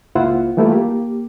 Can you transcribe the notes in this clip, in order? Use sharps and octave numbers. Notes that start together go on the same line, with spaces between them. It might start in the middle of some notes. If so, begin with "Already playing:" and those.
C#2 A#3 E4 F4 C5 F#5
E3 G3 A3 A#3 E4 F4
A#3 G4